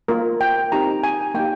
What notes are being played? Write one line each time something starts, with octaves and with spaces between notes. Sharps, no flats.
A#3 F4 A#4
G5
C4 D#4 G4 A#5
G#5
A#3 D#4 G4 G5